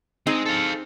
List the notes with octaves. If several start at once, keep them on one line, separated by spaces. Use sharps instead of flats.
G#3 C4 D#4 G#4
A4 F5